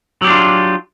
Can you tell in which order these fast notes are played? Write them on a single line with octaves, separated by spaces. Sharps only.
F#3 G4 D4 F4